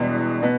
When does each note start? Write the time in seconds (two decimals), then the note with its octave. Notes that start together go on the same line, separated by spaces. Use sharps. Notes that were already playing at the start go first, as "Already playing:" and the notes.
Already playing: E1 E2 B2 G3 B3
0.42 B2 B3